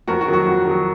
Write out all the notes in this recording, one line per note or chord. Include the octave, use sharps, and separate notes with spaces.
F2 F#4 A#4
F#4
D#3 F#3
F#4
F2 F#4
D#3 F#3